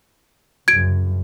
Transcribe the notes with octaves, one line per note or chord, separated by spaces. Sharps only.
C2 F#2 C#3 G#6 D7